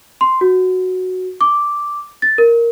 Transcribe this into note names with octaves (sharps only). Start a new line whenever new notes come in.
C6
F#4
D6
A6
A#4